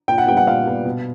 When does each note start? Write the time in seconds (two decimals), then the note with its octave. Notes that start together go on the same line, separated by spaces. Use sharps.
0.08 A#2 G5
0.18 F#5
0.27 G3 B3 G5
0.37 F#5
0.47 A#2 F5
0.66 G3 B3
0.85 B2